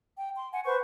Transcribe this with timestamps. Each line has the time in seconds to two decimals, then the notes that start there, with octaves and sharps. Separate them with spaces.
0.19 G5
0.36 C6
0.52 F#5 G#5
0.65 B4 C5 C#6